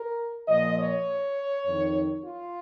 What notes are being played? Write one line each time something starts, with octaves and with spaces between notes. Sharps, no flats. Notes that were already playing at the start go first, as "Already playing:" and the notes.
Already playing: A#4
A#2 F3 D#5
C#5
F2 D#3
F4